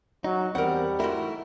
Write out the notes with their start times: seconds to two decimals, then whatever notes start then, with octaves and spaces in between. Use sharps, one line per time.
0.24 F#3 D#4
0.55 E2 G3 C4 A#4 F#5
1.00 G#2 A3 D#4 E4 F#4 A#4